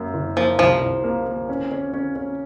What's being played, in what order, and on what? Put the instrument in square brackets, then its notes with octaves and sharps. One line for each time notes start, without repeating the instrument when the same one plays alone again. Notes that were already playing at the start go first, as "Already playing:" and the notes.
Already playing: [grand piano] F#2 A#3
F#1
[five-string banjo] F3 [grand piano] A#3
[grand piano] C2 [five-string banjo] F3
[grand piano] C2
A#3
A#3
C#4
C#4
C#4
C#4